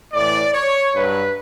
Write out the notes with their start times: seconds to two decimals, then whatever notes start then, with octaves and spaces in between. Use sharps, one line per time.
0.14 A2 E3 D5
0.53 C#5
0.95 G2 F#3 B4